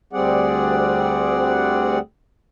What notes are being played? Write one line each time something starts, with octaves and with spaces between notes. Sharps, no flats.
D2 G3 C4 G#4 D5 F#5